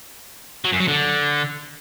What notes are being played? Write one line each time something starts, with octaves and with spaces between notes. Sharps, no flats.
F#3
F#2
F#3
D3